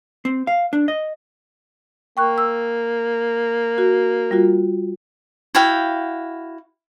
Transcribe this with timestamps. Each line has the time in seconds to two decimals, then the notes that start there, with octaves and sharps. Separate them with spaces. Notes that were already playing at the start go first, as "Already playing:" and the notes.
0.25 C4
0.47 F5
0.73 D4
0.88 D#5
2.17 A#3 G5 C#6 F#6
2.38 E6
3.78 F#4
4.31 G3 F4 F#4
5.55 E4 F#4 F5 G5